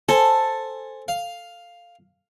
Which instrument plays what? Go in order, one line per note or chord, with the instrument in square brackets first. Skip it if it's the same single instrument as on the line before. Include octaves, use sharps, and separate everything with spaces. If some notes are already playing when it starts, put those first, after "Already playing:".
[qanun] A4 [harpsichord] C5 G#5
[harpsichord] F5